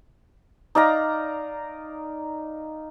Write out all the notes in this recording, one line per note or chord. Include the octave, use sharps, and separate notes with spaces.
D#4 D5 F5 A#5